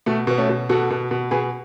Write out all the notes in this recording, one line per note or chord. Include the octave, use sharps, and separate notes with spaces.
B2 A3
B2 B3
A3 C#4
B2
B2 F#4 A4
B2
B2
B2 G#4 B4